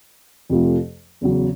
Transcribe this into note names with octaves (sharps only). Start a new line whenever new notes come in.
F2 C3 F3 A3
E2 C#3 F#3